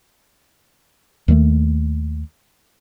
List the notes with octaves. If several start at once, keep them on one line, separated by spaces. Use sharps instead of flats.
D#2 D#3 G3 A3